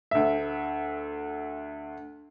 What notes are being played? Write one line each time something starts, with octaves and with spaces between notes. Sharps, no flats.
D2 E5